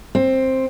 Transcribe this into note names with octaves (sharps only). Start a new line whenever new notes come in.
C4